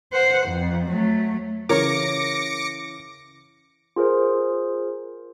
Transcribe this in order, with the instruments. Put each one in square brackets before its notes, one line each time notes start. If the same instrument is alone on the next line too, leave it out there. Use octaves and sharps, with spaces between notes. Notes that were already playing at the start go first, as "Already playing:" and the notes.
[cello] C5 F#5
F2
F#3 A3
[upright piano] C#3 E3 [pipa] A#4 C#5 [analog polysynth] D6 A#6 C#7
[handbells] F4 G#4 A#4 C5